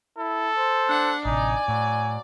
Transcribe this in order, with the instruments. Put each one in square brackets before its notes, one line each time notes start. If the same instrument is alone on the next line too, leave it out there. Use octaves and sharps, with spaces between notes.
[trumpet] E4 [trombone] A4
[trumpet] C5
[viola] D4 F#5
[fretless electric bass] A1 C3 [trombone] D#4 [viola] D5 [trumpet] G#5
[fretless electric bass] A2 [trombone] F#3